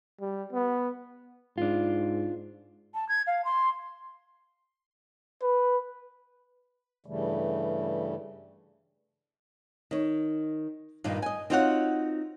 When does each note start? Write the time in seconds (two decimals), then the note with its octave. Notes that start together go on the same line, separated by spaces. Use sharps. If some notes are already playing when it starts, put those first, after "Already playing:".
0.20 G3
0.52 B3
1.58 G#2 D4 F4
2.95 A5
3.09 G#6
3.27 F5
3.45 C6
5.42 B4
7.06 G2 C#3 E3 G3 A3
9.91 D#3 C#5
11.04 G2 A#2 D#3 A#3
11.22 D#5 G#5
11.50 C4 D#4 F4 F#4 C#5 F#5